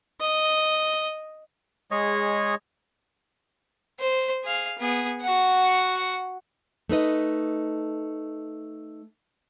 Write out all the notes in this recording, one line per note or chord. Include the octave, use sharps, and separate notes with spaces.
D#5
G#3 G#4 C#5 D#5
C5
G#4 F5
B3 G#4
F#4 F#5
A3 D#4 B4 D#5